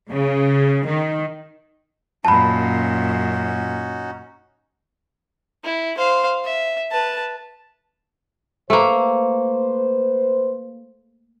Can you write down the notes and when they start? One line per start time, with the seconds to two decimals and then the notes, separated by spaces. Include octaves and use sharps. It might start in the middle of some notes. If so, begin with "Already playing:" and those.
0.11 C#3
0.87 D#3
2.25 F#2 A#2 C#4 D#4 F#4 A5 B5
5.64 E4
5.97 C5 F5
6.45 E5
6.91 B4 A5
8.70 A3 A#3 B4 C5